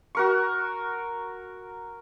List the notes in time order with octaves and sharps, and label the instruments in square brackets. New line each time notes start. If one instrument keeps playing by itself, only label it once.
[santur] F#4 A#4 C#6